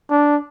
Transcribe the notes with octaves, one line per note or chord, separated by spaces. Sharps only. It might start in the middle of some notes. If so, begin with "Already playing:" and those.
D4